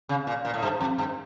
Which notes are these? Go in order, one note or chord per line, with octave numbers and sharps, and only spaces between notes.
C#3
A#2
A#2
A2
G2
F2
G2